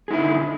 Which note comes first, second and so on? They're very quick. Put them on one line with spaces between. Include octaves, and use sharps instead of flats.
G#4 D#4 E4 D3